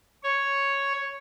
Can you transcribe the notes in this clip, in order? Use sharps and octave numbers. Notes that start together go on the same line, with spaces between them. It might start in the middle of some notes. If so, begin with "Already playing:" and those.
C#5